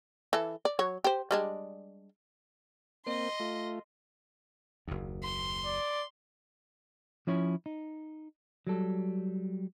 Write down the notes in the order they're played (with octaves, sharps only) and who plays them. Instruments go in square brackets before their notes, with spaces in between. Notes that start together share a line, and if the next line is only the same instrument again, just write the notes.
[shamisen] E3 A4
D5
F#3 C#5
G4 C5
G3 G#3 D4
[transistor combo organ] A#3 C4 [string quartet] D#5 C6
[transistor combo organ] A3 F4
[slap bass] F#1 D#2
[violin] C6
[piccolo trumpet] D5
[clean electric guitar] F3 C#4 E4 C#5
D#4
F#3 G3 A4